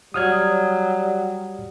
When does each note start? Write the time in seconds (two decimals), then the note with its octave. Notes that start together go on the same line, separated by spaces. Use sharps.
0.14 F#3 G3 D#6 F6 G#6